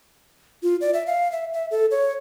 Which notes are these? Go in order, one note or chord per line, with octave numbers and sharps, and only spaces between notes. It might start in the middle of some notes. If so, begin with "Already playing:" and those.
F4
D5
E5
F5
E5
E5
A4
C#5